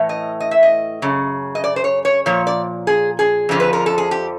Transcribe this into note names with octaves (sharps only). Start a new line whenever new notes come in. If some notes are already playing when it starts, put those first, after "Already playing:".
Already playing: A2 E3
D#5
D#5
E5
D#5
F#2 C#3
D#5
D5
C5
C#5
C#5
A#2 F3 C#5
D5
G#4
G#4
F2 D3 F3
B4
A#4
A4
G#4
G4